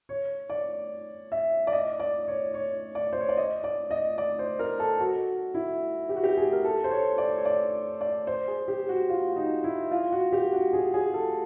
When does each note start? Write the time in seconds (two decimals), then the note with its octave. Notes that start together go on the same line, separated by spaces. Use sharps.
0.09 C#5
0.50 D5
1.32 E5
1.67 D5
1.72 D#5
2.00 D5
2.28 C#5
2.54 C#5
2.95 D5
3.13 C5
3.21 C#5
3.29 D5
3.37 D#5
3.64 D5
3.91 D#5
4.18 D5
4.39 C5
4.59 A#4
4.79 A4
5.00 F#4
5.54 E4
6.09 G4
6.16 F#4
6.23 G4
6.37 G#4
6.53 A#4
6.65 A4
6.84 C5
6.91 C#5
7.18 D5
7.38 C#5
7.45 D5
8.01 D5
8.27 C5
8.48 G#4
8.68 G4
8.89 F#4
9.10 F4
9.36 D#4
9.64 E4
9.91 F4
10.12 F#4
10.32 G4
10.53 F#4
10.73 G#4
10.94 G#4
11.14 A4